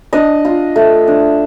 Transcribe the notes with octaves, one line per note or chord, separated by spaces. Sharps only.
D4 D#5
F4
A3
D4